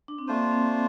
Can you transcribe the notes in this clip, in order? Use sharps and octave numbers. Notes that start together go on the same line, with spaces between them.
D4
C4
A3 A#3 D4 F4 C5
C4